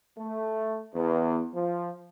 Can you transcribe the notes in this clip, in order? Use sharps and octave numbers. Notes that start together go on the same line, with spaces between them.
A3
E2
F3